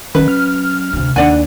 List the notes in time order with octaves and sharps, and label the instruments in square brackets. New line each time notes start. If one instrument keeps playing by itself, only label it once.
[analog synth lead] D#3 [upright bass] F#3 C#4 [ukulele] B4
[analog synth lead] F6
[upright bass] D2 C3
[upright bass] D#2 [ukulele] D4 D5 G#5 [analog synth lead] F#5